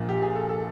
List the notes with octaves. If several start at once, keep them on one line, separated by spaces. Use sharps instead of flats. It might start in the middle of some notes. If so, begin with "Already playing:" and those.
Already playing: A#1 A#2 F3
G4
G#4
A4
A4